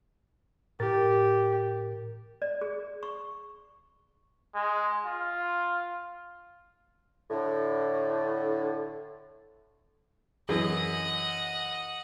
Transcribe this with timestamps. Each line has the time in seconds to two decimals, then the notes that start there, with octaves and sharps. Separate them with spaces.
0.80 A2 G4 A#4 A6
2.42 D5
2.61 G#4
3.03 C#6
4.54 G#3
5.05 F4
7.30 A2 D3
10.49 F#2 E3 G#4 D#5 F#5